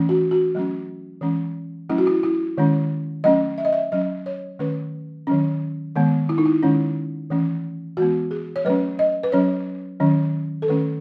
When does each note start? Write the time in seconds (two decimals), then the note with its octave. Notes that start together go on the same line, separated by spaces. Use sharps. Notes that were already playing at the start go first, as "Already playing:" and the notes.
Already playing: E3 A3 C#4
0.09 F#4
0.31 F#4
0.55 F#3 A3 C#4
1.21 E3 G#3 C#4
1.89 F#3 A3 C#4 E4
1.98 F#4
2.07 E4
2.23 E4
2.58 D#3 G#3 C#4
3.24 F#3 A3 C#4 D#5
3.58 E5
3.65 D#5
3.73 E5
3.92 F#3 C#4 D#5
4.26 C#5
4.59 D#3 A3 C#4 B4
5.27 D#3 F#3 C#4
5.95 D#3 G#3 B3
6.29 E4
6.38 D#4
6.45 E4
6.63 D#3 G#3 C#4
7.30 E3 A3 C#4
7.97 E3 G#3 B3 F#4
8.31 G#4
8.56 C#5
8.65 F#3 A3 C#4 B4
8.99 D#5
9.23 B4
9.32 F#3 C#4 C#5
10.00 D#3 F#3 C#4
10.62 A4
10.68 D#3 A3 C#4 B4